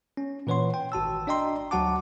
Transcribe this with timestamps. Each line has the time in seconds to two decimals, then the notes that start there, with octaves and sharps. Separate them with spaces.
0.17 C#4
0.47 A#2 E3 B4 C#5 F#5 C6
0.74 G5
0.92 G#1 F#4 A5 E6
1.27 D4 D5 D#5 G5 A#5 C6
1.71 D2 F#3 F#4 F#5 A5 D6